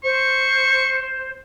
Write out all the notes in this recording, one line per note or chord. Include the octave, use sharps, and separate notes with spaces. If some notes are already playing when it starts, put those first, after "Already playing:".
C5 C#6